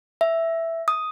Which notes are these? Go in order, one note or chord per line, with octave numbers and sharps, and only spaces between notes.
E5
D#6